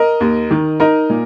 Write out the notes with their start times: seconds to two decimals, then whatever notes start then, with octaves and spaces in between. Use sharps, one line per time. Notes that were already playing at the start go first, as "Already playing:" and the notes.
Already playing: A#4 D#5
0.20 D#2
0.51 D#3
0.80 D#4 A#4 D#5
1.10 A#2